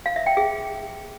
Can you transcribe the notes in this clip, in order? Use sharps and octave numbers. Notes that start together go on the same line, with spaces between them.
F5
E5
G5
G#4